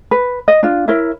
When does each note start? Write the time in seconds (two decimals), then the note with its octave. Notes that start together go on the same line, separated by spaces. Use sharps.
0.11 B4
0.48 D#5
0.63 D4 F4
0.88 E4 A#4 C#5 E5